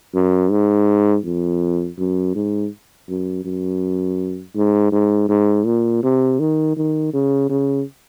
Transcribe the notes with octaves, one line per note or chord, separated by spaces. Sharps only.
F#2
G#2
F2
F#2
G#2
F#2
F#2
G#2
G#2
G#2
A#2
C3
D#3
D#3
C#3
C#3